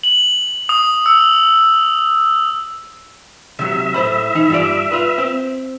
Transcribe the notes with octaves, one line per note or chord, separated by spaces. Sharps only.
F#7
D#6
E6
C3 F#3 E5
A2 C5 B5
E3 D#4
G2 F4 D5
F4 B4
C4